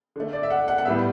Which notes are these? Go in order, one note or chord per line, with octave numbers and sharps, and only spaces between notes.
D3 A3
D5
E5
F#5
F#5
F#5
A2 G3 B3 E5